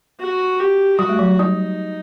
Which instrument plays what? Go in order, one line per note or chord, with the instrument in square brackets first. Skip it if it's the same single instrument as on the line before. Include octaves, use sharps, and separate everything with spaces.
[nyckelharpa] F#4
G4
[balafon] G3 [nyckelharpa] F#4
[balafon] A3
F#3
[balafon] G3 [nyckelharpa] D#4